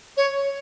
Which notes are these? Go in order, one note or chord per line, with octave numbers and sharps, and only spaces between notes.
C#5